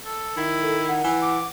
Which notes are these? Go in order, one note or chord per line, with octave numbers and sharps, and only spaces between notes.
A4
D#3 E4
A4
F#5
E3
D6